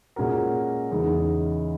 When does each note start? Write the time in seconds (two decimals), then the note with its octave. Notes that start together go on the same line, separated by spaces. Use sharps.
0.16 A#2 G#3 C#4 F#4 A#4
0.91 E2 C#3 G#3 D#4